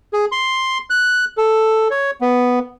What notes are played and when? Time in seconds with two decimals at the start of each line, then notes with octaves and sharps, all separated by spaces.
0.13 G#4
0.32 C6
0.90 F#6
1.38 A4
1.91 C#5
2.21 B3